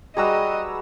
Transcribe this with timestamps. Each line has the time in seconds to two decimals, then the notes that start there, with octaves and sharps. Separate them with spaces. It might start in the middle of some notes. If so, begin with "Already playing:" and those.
0.17 G3 F#4 G#4 B4 D#5 A#5 E6